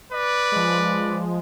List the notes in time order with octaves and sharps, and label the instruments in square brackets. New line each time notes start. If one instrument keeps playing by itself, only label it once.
[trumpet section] B4 D5
[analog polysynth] F3 G#3